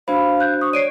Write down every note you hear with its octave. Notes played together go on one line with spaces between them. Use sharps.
D4 F#4 C5 F5 B5
F#6 G6
C#6 D#6
C#5 D5 C7 D7 D#7